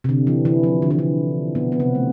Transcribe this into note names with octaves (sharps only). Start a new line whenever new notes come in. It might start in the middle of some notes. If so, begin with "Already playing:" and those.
C3
D3
E3
E3
F3
D3
E3
D3
B2 B3
B3
C3 C4
A3